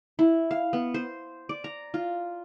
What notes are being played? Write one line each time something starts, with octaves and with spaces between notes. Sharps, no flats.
E4
F5
B3
C5
D5
A#5
F4